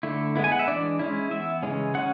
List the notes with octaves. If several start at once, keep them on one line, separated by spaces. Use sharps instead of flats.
D3 A3 E4
G#3 B3 E4
G#5
F#5
E5
E3 G#3 D4 D5
G#3 C#4 E4
E3 B3 E4 E5
C#3 E3 G#3 C#4
G#3 C#4 F#5